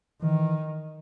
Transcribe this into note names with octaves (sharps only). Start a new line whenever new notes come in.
D#3 E3